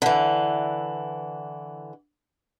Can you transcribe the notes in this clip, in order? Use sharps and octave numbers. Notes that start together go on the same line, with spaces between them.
D3 E3